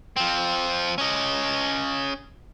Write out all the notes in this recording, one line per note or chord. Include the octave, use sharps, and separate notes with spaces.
F3 C4
C#4 D#5